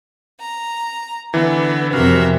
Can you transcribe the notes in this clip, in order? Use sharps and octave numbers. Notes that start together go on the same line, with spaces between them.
A#5
D3 E3 B3
F2 C3 F#4 A#4 E5 F5